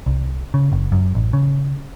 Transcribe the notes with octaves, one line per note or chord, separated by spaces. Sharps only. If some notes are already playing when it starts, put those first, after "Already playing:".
C2
C#3
F#1
F#2
A1
C#3